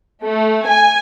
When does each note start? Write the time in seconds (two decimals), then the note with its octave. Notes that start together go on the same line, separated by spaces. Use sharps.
0.23 A3
0.68 G#5